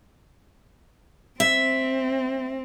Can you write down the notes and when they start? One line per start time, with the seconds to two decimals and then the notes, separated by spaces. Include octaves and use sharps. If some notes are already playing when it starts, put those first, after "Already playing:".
1.40 C4 E5